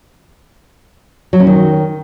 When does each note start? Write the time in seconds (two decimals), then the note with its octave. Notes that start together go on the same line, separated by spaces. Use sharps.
1.33 F#3
1.40 C#4
1.47 D#3